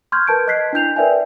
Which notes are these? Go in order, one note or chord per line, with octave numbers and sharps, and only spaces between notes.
C6 C#6 F6 G6 G#6
A#4 B4 A5 G6 D7
D#5 F#6 G#6 B6 C7
D4 E4 G6 F7
A#4 B4 D5 E5 G5 G#5